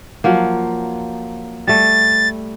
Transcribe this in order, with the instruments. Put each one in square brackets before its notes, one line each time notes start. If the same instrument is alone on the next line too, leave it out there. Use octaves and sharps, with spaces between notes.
[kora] F3 F#3 A#3
[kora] G3 A3 [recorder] A6